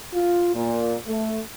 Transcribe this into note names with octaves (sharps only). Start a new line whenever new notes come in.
F4
A#2
A3